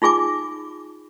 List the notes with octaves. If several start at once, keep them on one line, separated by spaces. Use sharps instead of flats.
D#4 F4 G#4 G#5 D6